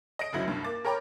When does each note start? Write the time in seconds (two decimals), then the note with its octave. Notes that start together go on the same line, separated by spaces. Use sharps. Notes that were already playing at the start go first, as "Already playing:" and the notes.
0.19 D#5 D#6 A#6 D7
0.33 F#1 D2 F#3 E4
0.48 C2 G2
0.64 A#3 D6 A6
0.85 A#4 C#5 G5 A#5 B5 D6